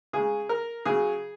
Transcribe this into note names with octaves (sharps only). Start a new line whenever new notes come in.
C#3 G#3 G#4
A#4
C#3 F#3 G#4